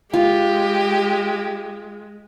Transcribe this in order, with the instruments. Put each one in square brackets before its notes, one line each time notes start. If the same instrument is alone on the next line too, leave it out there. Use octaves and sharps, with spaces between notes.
[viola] G#3 [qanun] F4 [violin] G4